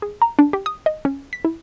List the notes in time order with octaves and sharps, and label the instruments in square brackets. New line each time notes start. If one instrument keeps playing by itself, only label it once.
[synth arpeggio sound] G#4
A#5
D4
G4
D#6
D#5
C#4
B6
E4